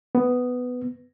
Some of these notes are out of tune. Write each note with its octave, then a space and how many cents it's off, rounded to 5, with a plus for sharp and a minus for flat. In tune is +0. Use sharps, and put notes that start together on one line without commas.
B3 +10